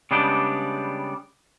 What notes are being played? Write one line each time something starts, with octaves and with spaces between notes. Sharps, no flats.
C#3 G3 G#3 B3 D4 G4